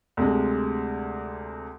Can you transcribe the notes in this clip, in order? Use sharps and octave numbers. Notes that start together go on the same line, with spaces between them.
D2 C3 G#3